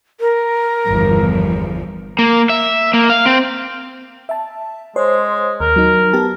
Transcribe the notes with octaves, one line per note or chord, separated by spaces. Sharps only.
A#4
G1 E2 F3
A#3
E5
A#3
F5
C4
E5 A5
G#3 C5 C#5 C6
D#2 A#4
F#3 D#4
B3 G4 A5